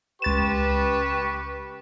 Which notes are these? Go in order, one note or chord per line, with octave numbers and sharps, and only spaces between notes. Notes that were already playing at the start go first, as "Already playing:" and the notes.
C#2 G4 B4 C#6 A6 E7